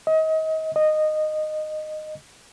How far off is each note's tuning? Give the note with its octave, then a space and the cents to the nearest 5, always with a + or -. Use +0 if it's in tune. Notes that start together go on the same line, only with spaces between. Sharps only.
D#5 +30
D#5 -15